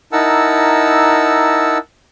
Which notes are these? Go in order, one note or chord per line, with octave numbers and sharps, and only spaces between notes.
D#4 E4 A#4 F#5 A5 E6